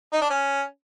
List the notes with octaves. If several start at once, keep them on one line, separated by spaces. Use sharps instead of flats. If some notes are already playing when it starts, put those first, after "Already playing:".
D#4
D4
C#4